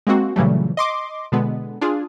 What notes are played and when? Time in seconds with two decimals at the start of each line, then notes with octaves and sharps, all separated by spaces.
0.07 G#3 A#3 C4 F#4
0.36 A#2 C#3 E3 F#3 G3 A3
0.77 D#5 C6 D6
1.32 B2 D3 G#3 B3
1.81 D4 F4 G#4